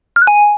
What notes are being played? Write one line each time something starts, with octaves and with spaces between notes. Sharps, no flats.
F6
F#6
G#5